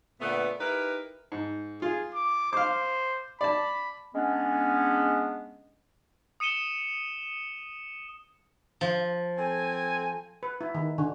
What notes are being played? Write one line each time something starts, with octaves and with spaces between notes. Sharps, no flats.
A#2 D3 A3 B3
D#4 E4 G4 A#4 B4
G#2
F4 G#4
D6
C5 F5 D6
D5 A5 B5
G#3 B3 C#4 D4
D#6 C#7 D#7 E7 G7
F3
C4 A4 G#5
B4
E4
D#3
D3